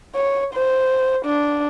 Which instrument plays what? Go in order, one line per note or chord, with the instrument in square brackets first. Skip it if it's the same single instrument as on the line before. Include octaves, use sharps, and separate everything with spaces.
[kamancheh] C#5
C5
D4